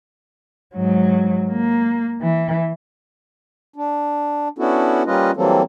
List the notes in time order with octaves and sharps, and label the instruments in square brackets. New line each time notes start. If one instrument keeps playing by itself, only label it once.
[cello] G#2 F#3
A#3
E3
[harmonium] D4
B3 C#4 D4 E4 F#4 A4
G3 A#3 C#4 F4 B4 D#5
E3 F#3 G3 A#3 C4 A4